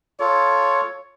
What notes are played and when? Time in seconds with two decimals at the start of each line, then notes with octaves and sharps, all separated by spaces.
0.20 F4 A4 C#5